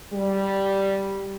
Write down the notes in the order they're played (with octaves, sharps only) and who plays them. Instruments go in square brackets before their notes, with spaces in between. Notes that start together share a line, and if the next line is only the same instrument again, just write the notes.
[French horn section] G3